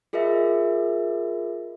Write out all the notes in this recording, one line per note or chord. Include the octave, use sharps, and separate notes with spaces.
F4 G#4 A#4 D#5 E5